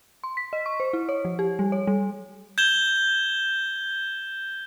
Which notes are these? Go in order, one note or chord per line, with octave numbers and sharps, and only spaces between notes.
C6
B6
D#5
C#6
C5
E4
C#5
F3
G4
G3
C#5
G3
G6 G#6 E7 G7